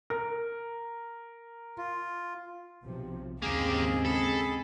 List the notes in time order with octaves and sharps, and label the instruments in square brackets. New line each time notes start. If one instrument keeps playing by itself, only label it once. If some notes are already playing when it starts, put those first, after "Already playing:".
[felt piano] A#4
[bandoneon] F4
[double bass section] B1 C3 F3
[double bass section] D#2 G#2 [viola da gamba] C#3 G#3 C4 [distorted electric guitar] A#3 G4 [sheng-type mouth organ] G#4
[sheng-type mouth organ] G#4 B5 [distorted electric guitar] A4